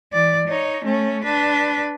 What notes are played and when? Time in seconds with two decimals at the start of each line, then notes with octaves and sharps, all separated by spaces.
0.13 E3 D5
0.48 D#4 C#5
0.85 A3 C#4
1.24 D4 B4